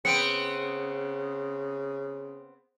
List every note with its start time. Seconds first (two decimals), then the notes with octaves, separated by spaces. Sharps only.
0.05 C#3 B3 C4 C#7 D7